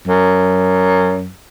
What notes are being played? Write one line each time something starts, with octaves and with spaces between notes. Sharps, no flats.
F#2